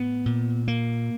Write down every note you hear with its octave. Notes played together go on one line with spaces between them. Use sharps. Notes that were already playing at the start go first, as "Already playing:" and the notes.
Already playing: A2 B3
A#2
A#3